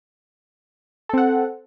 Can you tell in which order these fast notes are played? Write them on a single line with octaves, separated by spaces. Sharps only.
A4 C4 F#5